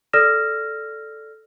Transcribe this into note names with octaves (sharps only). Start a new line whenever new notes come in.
A4 D5 E6 F6 A#6 E7